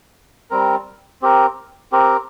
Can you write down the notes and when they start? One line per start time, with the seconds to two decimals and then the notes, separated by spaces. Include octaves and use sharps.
0.51 G3 C4 A#4
1.22 C4 G4 A#4
1.92 C4 G4 A#4